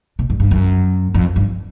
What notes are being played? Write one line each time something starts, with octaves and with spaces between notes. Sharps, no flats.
B2
G2
G2
F#2
F2
G2